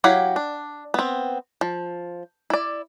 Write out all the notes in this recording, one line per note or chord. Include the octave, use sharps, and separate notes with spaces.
F#3 E4 G4 F5 F#5
D4
B3 C4
F3
E4 D5